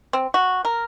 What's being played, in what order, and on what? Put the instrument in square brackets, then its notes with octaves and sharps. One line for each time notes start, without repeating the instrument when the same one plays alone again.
[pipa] C4
F#4
A#4